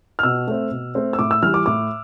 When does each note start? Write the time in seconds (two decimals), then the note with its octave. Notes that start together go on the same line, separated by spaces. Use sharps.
0.19 F6
0.23 B2 E6
0.47 A3 C4
0.71 B2
0.95 A3 C4
1.13 E6
1.19 A2 D6
1.31 E6
1.42 E3 G3 F6
1.54 D6
1.66 A2 D6